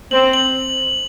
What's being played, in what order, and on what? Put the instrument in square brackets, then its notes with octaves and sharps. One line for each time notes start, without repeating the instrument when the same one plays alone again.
[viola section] C4 [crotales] F#7
[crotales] F#7